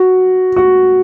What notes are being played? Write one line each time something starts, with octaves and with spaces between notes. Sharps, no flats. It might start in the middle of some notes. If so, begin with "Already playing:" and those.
Already playing: F#4
F#4